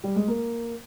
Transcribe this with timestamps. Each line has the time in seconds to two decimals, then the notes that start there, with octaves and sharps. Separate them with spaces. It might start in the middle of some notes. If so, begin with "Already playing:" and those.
0.04 G3
0.16 G#3
0.28 A#3